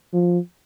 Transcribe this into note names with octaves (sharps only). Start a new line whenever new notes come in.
F3